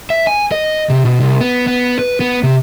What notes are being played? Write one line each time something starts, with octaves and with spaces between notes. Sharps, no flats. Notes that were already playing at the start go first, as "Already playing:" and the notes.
E5
G#5
D#5
C3
B2
C2
B3
B3
B4
B3
C3